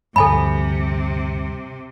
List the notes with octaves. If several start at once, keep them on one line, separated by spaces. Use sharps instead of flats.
D2 G2 C3 A4 G#5 B5